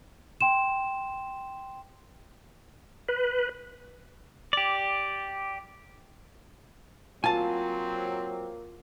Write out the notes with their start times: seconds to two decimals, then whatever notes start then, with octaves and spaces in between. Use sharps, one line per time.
0.41 G5 C6 E7
3.08 B4
4.53 G4 D5
7.24 F#3 A#3 C4 F4 G#5 A5